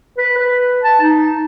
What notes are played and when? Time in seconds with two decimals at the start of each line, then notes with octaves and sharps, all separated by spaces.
0.18 B4
0.37 B4
0.83 A5
1.02 D#4